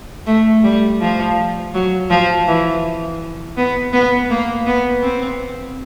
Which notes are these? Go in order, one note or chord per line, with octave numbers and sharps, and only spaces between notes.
A3
G3
F3
F#3
F3
E3
B3
B3
A#3
B3
C4